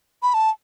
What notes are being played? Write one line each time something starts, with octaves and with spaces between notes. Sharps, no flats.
B5
A5